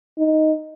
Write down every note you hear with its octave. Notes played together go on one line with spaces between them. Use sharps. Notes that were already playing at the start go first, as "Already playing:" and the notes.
D#4